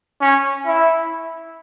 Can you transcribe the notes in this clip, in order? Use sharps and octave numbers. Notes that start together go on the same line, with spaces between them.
C#4
E4